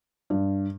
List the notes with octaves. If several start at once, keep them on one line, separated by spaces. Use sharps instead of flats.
G2